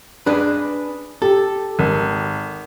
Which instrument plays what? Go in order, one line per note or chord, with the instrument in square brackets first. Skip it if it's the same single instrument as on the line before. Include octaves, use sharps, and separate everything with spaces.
[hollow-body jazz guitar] D4 G#4 B4
[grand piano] G4 [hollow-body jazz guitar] A4
[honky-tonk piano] G#1